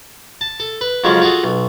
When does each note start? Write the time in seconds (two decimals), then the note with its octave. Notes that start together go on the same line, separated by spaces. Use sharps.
0.41 A5
0.60 A4
0.81 B4
1.04 F2 C#3 F3 F#3 G#3 C#4
1.22 F4 F#4 G#4 A4
1.44 B1